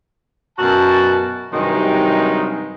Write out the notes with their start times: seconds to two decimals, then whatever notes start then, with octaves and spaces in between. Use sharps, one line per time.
0.59 F#2 B2 F#4 A#4 A5
1.53 G2 C3 D#3 F#3 G#3 D#4